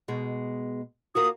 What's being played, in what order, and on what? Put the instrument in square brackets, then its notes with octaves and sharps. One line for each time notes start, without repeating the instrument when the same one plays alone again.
[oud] B2 G#3
[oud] A#3 F4 F#4 [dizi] D#6